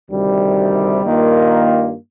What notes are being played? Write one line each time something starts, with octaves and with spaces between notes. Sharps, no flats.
D2 C3 D#3 G3
G2 D#3 A#3 F4